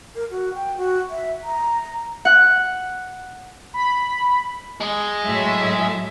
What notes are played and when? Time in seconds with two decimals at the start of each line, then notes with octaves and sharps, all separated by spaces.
0.15 A#4
0.31 F#4
0.55 G5
0.78 F#4
1.10 E5
1.44 A#5
2.25 F#5 F#6
3.74 B5
4.80 G#3 G#4
5.25 A2 F#3 E5